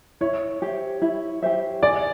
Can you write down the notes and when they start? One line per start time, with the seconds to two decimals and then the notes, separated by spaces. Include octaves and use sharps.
0.21 E4 C#5
0.62 G4 C5 E5
1.02 E4
1.42 G4 C5 E5
1.83 G#4 D5